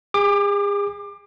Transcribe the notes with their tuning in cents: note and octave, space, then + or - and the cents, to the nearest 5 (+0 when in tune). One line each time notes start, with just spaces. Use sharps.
G#4 -40 D6 +25